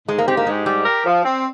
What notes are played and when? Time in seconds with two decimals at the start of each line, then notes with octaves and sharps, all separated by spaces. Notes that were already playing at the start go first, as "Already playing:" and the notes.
0.08 G#2 G#3
0.18 A#3
0.27 C4 G4
0.37 A#3
0.47 G#2 G#3
0.66 G3 G4
0.86 A#4
1.06 F3
1.25 C4